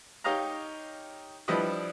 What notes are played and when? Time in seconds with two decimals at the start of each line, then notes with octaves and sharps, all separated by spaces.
0.24 D#4 G4 C#5 D#5 F5 A#5
1.48 F3 G3 D4 E4 B4 D#5